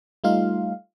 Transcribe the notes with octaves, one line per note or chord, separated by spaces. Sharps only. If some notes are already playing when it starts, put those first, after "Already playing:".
G3 A3 D#4 F4 F5